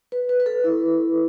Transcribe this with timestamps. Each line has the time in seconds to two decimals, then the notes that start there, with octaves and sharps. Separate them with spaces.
0.12 B4
0.29 B4
0.40 B4
0.46 A4
0.64 E4